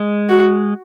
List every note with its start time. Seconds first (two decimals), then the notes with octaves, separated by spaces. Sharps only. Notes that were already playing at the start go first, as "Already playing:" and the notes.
Already playing: G#3
0.29 F#4